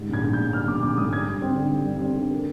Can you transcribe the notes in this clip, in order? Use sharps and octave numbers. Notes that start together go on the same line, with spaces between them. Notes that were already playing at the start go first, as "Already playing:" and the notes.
Already playing: G#2 G3
A#1 G#6
A#1
G6
G#2
G3 F6
A#1 D6
A#1 D6
G#2 D#6
G3 G#6
G2
C4
D3
G3
G2
C4
D3
A#3